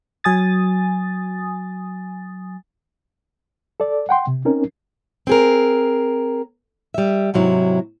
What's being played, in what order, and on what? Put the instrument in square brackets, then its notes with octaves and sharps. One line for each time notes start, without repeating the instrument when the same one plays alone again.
[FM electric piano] F#3 G#5 D#6 A6
[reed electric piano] A4 D5
F#5 G5 C6
C3
C4 C#4 D#4 A#4
[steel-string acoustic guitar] C4 G#4 A#4
G3 E5
G#2 C3 F#3 E4